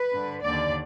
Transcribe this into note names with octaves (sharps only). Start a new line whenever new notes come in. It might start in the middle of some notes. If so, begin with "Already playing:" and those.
Already playing: B4
G2 D3
D#2 D3 D5